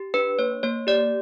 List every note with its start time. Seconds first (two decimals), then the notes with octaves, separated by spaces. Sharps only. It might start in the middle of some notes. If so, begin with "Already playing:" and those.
Already playing: G4
0.14 D4 B4
0.39 A#3 C#5
0.63 A#3 C#5
0.87 G4 D5